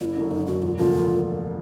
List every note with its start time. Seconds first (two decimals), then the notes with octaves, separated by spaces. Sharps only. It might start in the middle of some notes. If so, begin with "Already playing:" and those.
0.01 F#1 E4 F4
0.16 F#2 D3
0.31 F#1 D#4
0.46 F#2 D3 F#4
0.62 E1 F4
0.78 D2 C#3 F3 A#3 F4
0.92 E1